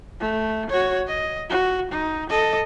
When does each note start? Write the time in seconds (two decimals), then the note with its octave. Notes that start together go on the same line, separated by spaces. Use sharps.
0.20 A3
0.70 F#4 C#5
1.07 D#5
1.49 F#4
1.91 D#4
2.30 A4 D#5